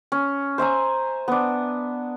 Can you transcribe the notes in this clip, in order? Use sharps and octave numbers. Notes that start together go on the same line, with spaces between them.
C#4
C5 E5 G#5 A#5
B3 D4